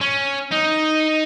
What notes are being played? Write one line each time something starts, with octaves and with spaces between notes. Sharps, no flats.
C#4
D#4